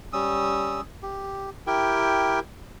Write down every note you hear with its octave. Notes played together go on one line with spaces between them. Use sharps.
G3 C#4 D#6 E6
G4
E4 G4 A#4 G5